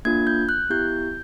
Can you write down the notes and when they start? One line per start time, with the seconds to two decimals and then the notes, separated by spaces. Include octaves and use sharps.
0.05 A#3 D4 F4 G#6
0.27 G6
0.49 F#6
0.70 B3 E4 G4 G6